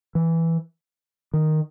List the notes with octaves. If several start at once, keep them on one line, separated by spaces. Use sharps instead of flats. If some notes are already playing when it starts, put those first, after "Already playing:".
E3
D#3